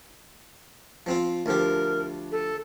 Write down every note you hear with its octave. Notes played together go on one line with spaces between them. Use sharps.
F3 C4 F4
D2 F3 G4 A#4
A4